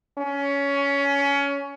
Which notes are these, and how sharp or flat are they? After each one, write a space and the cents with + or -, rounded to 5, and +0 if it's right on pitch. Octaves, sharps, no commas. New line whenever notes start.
C#4 +20